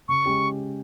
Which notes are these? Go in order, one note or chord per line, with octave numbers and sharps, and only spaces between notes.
C#3 C#6
G#3 C#4 G4